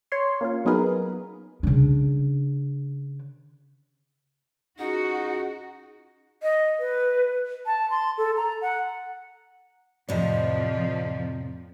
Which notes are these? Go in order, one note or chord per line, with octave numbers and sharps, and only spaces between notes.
C#5 C6
A#3 C#4 F4
F#3 B3 D#4 G#4 A#4 B4
C#3 D4
C#4 D#4 F4 F#4 G#4 F#5
D#5
B4
A5
C6
A4
A#5
F#5
F2 A2 C3 F3 D5 D#5